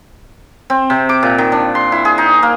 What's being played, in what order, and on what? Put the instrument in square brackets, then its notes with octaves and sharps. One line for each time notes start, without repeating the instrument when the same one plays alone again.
[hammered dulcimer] C4
C3
D6
A#2
D#3
D4
C6
E4
G#4
D#4
A#3